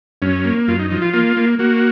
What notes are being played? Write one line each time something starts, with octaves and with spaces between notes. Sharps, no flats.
F#2 C#4
A#3
F#2 F4
D#4
F3 D#4
F4
A#3 F4
A#3
A#3 F#4